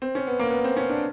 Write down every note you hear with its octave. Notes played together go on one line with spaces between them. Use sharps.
C4
C#4
B3
A#3
B3
C4
C#4
D4